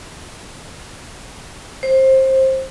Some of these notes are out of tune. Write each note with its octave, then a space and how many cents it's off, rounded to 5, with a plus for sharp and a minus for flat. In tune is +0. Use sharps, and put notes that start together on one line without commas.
C5 +20